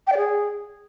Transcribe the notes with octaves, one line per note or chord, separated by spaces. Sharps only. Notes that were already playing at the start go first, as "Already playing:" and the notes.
G5
D5
G#4